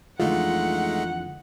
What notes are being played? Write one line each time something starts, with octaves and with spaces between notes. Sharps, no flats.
F2 D3 E3 G#3 A3 D#4 F4 F#5